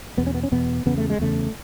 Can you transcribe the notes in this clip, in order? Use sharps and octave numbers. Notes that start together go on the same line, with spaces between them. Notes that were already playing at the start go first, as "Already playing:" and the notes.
E2 B2 B3
C#4
B3
C#4
E2 B2 B3
E2 C#3 B3
A3
G#3
E2 C#3 A3